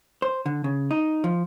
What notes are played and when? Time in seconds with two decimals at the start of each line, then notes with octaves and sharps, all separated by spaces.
0.22 C5
0.46 D3
0.64 C#3
0.91 D#4
1.24 F3